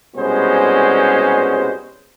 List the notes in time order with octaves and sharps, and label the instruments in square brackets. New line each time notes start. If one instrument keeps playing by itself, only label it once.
[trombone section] C2 B2 G3 G#3 C#4 C5